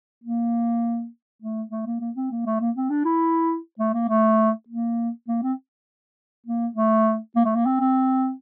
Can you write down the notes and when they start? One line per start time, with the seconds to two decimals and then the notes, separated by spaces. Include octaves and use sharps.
0.24 A#3
1.42 A3
1.71 A3
1.86 A#3
2.01 A#3
2.16 C4
2.31 A#3
2.46 A3
2.60 A#3
2.76 C4
2.90 D4
3.05 E4
3.79 A3
3.94 A#3
4.09 A3
4.68 A#3
5.28 A#3
5.42 C4
6.46 A#3
6.76 A3
7.36 A#3
7.45 A3
7.55 A#3
7.66 C4
7.80 C4